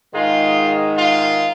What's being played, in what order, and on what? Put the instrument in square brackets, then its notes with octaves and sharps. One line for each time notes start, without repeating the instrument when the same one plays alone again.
[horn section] G#2 D#3 G#3 D#4 F4
F4